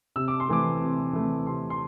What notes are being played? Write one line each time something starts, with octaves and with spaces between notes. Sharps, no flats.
C3 E6
D6
C6
E3 A3 C4 D6
C3
E3 A3 C4
C3 C6
C6